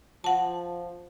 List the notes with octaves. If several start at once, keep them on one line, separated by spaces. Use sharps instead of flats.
F3 F#5 A5